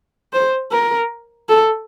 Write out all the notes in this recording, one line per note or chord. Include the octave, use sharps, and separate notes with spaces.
C5
A#4
A4